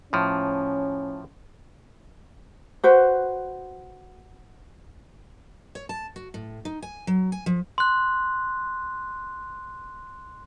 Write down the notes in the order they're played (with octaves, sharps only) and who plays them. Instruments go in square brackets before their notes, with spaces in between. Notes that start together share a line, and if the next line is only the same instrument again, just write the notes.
[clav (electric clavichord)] A2 F3 [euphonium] C#4
[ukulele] F#4 B4 C5
[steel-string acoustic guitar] C#5
A5
F#4
A2
D#4
G#5
F#3
G#5
F3
[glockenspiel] C6 F#6